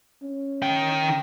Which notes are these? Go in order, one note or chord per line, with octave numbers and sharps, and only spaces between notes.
C#4
D#3 G5